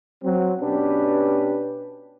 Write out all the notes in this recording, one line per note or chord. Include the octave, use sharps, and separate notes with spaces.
F#3 C4
B2 C#4 D4 G4 B4